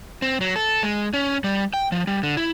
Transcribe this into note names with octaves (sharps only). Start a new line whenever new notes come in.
C4
F#3
A4
G#3
C#4
G3
G5
F3
G3
D3
E4